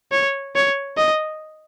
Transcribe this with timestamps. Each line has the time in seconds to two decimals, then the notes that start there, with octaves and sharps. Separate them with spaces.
0.12 C#5
0.55 C#5
0.97 D#5